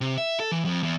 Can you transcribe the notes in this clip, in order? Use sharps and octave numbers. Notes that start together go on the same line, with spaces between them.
C3
E5
A4
E3
F2
E2